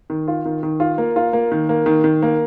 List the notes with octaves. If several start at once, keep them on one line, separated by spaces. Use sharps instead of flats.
D#3
F4
D#3
D#3
F4
A#3
F4
A#3
D#3
A#3
D#3
D#3
A#3